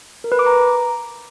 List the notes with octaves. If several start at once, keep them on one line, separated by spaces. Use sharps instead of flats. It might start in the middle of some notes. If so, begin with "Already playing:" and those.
A#4
B4
D6
A#5